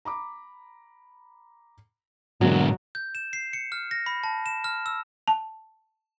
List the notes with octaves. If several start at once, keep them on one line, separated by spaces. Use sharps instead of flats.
A#5 B5 D6
E2 G#2 B2 D3 F#3 A#3
G6
E7
C7
C#7
F6
A#6
B5
A5
E7
F6
E6
A5